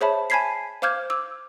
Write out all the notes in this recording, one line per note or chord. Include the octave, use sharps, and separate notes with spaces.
G#4 C5 C#5 E5 A5 B5
G#5 A5 B5 G#6 B6 C7
C5 F5 D6 F6 G6 G#6
D6 E6